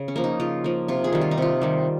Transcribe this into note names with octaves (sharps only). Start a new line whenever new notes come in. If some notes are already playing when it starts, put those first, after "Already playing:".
Already playing: C#3
C#4
F3 A#3
D#4
C#3 F4
F3 A#3
C3 F4
G#4
D#3 G3
F4
D#4
C3 F4
D#3 G3